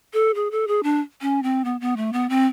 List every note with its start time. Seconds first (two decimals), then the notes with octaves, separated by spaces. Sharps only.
0.13 A4
0.35 G#4
0.51 A4
0.68 G#4
0.83 D4
1.21 C#4
1.43 C4
1.65 B3
1.81 B3
1.97 A3
2.13 B3
2.29 C4